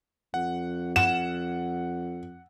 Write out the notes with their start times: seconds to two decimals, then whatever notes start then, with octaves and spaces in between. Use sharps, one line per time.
0.34 F2 F#5
0.96 F#5 E7